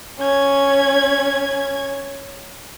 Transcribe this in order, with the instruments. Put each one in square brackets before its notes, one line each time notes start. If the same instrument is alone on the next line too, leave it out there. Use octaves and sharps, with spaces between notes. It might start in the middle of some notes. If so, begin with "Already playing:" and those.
[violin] C#4 G#6